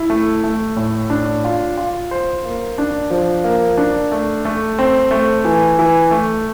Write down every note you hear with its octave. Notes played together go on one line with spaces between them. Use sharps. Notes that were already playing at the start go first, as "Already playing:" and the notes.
Already playing: E4
A3
A3
A2
D4
F4
F4
C5
A#3
D4
F3
A#3
D4
A3
A3
C4
A3
E3
E3
A3